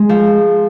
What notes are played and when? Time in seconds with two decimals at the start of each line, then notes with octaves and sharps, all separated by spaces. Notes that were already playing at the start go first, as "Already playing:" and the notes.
Already playing: G#3
0.09 F3